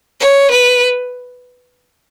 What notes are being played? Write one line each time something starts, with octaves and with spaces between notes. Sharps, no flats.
C#5
B4